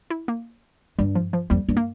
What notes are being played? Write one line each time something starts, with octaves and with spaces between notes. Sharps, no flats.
E4
A#3
G2 G3
F3
F3
F2 G3
G2
A#3